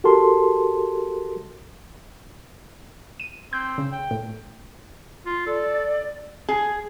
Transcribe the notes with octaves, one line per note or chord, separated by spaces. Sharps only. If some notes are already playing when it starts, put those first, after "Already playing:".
F#4 G4 A4 A#4 A5 C6
D#7
C4 G6
C#3
G5
A2
F4
A4 D5
G#4